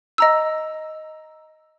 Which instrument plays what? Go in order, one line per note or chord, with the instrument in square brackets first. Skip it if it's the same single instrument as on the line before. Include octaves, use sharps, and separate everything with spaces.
[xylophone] D#5 A#5 E6